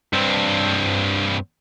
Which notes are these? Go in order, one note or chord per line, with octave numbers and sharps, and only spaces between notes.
G2 C4